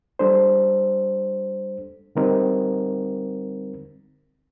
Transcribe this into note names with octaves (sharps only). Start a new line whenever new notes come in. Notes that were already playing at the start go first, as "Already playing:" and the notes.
G3 D4 A4 C5
D3 G3 C4 D#4 A#4